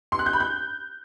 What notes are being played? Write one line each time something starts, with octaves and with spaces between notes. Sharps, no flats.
C6
F#6
G6
B5
G6